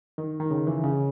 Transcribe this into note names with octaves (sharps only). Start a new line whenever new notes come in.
D#3
D#3
C#3
E3
C#3